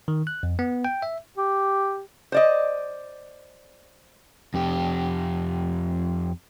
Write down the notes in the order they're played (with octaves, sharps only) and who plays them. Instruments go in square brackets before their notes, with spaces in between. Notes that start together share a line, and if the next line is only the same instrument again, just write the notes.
[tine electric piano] D#3
F#6
F2
B3
G5
E5
[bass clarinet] G4
[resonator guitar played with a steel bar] C5 D5 D#5
[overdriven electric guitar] F2 G4